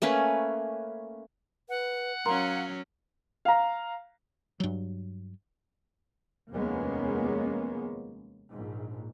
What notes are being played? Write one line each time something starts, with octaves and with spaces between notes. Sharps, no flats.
A3 A#3 C#4 B4
B4 F#5
F#3 C#4 A#4 F5 A#5 C6
F5 A#5
G2 F#3
F1 D#2 G#3 A#3 B3 C#4
A#1 G#2